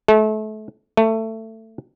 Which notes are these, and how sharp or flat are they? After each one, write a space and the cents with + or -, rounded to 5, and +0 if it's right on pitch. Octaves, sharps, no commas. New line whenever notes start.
A3 -30
A3 +20